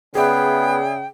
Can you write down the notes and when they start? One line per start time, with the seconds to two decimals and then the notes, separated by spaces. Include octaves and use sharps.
0.15 C#3 B3 G#4 D5 E5 G5